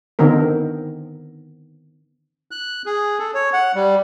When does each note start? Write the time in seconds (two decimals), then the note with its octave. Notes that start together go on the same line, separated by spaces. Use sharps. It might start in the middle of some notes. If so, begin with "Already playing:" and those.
0.19 D3 D#3 B3 C4 A#4
2.51 F#6
2.86 G#4
3.19 A4
3.34 C#5
3.53 F#5
3.75 G3